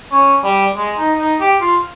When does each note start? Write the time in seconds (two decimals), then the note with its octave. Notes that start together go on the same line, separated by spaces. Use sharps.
0.11 C#4
0.43 G3
0.76 G#3
0.98 D#4
1.18 D#4
1.40 G4
1.61 F4